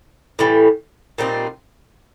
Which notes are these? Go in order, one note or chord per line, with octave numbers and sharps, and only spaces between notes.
A2 E3 G3
A#2 G3 C4 D#4